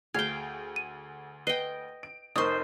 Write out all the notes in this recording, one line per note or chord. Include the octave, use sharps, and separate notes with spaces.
D2 G#4 F5 G5 G#6
D#7
B4 D#5 G5 C7
D7
F1 D#4 A#4 C5 C#6 D#6